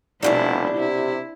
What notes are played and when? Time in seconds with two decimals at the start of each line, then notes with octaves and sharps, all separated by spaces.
0.23 F1 B2 E3 G3 D4 E4
0.77 C3 E4